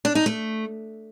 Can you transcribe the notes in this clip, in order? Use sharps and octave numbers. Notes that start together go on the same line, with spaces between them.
D4
D#4
A3